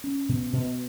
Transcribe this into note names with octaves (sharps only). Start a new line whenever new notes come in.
C#4
B2
B2